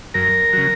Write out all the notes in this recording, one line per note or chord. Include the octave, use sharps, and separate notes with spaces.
F#2 A#4
C#3 F#3